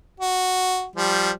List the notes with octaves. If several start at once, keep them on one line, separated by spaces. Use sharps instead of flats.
F#4
F3 G3